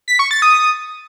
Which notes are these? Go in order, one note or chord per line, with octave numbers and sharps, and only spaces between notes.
B6
C#6
A6
D#6